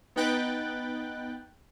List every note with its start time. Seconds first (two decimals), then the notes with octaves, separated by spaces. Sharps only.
0.16 B3 D#4 B4 G5 F#6 A6